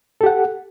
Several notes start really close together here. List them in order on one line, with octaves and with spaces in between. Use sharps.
A4 G4 F#5